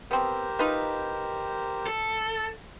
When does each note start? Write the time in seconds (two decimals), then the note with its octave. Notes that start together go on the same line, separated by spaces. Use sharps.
0.11 B3 C4 G4 A#4 C5
0.59 D#4 F4 B4
1.87 A4